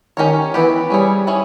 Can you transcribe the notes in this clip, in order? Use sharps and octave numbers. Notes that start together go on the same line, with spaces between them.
D#3 C#4 G4 A#4 C#5
E3 B3 G4 B4
G3 C#4 E4 G#4 C#5
C#4 E4 G#4 C#5